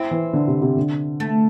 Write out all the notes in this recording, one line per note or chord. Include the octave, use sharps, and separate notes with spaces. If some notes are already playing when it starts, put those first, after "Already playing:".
Already playing: C4 E4
E3
D3
C3
C3
D3
A3